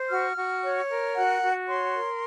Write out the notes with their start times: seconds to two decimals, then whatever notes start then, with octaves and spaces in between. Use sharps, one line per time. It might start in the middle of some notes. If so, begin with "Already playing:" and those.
Already playing: C5
0.09 F#4 F6
0.36 F#4
0.63 C#5
0.89 A#4
1.15 F#4 F#5
1.41 F#4
1.67 C#5 C6
1.94 A#4